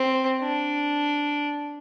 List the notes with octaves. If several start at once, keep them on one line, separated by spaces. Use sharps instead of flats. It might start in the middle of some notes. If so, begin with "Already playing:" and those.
Already playing: C4
D4